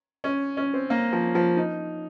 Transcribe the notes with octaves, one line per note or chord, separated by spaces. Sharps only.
C#4
C#4
C4
A#3
F3
F3
D#4